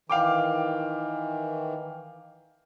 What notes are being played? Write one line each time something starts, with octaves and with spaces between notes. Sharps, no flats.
D#3 E3 F5 G5 D6